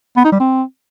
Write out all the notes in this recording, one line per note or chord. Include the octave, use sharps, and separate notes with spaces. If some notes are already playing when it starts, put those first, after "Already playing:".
B3
D#4
G3
C4